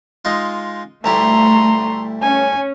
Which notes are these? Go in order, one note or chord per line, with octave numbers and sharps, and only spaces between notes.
G#3 D#4 F4
D2 G3 A3 E4 A#5 C6
C#4 G#5